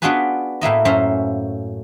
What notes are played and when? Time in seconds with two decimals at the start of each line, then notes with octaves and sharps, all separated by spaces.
0.02 B3 D4 F4 F#4 G#4 B4
0.61 A2 A#3 E4 D#5
0.85 F#2 C#4 C5 E5 F5